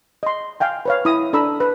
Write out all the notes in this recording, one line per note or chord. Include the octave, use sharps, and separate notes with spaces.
D#5 C6
F5 G5 G#5
B4 C#5 F5
E4 D#6
D4 A4 A#5 B5 E6
B4